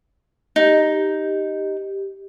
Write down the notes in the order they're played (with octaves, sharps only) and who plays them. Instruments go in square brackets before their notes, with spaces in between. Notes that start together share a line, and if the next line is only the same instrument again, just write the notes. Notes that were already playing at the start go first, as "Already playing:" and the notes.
[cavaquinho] D#4 [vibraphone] G4